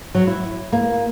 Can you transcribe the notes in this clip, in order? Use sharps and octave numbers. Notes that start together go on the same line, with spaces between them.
F#3
E4
A#3